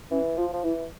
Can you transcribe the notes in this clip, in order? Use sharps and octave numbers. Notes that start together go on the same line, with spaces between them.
E3 C#4
F3 F4
F3
E3 E4